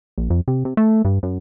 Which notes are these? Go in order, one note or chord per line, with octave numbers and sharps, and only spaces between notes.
A#1
F2
C3
C3
A3
G2
F#2